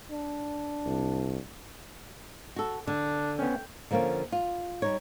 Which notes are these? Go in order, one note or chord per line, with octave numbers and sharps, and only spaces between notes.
D4
C2
F#4 A4
D3 D4
B3 C#4 G5
D3 F3 A#3 C4 C#4
F4
G3 D#4 C#5